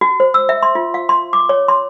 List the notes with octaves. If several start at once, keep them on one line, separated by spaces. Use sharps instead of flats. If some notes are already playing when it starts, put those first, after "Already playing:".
F#4
C5
E6
E5
C6
F4
F5
C6
D6
C#5
C6